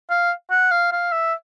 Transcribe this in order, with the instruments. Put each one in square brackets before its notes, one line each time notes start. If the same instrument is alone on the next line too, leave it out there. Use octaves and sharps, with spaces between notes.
[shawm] F5
F#5
F5
F5
E5